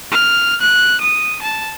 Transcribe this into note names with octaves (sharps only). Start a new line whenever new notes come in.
F6
F#6
D#6
A5